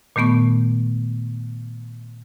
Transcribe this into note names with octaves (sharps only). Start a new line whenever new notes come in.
A#2 D#3 A3 B3 C#6